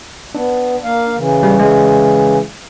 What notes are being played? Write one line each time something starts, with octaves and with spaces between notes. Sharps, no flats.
B3 D4
A#3 F5
C#3 E3
G3
G#3